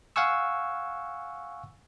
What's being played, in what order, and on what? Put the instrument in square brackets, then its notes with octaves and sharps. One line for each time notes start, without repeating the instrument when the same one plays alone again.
[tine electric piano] F5 F#5 G#5 C#6 E6